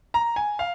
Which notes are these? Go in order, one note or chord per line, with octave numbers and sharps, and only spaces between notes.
A#5
G#5
F5